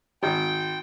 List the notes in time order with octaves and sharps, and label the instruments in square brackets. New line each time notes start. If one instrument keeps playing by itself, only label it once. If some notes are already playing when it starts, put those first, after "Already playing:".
[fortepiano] G#1 [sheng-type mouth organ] G5